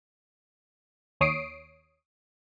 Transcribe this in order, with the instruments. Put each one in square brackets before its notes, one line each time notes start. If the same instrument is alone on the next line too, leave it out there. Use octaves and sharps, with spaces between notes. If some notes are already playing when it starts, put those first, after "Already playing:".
[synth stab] D#2 C#5 D#6 C7 D7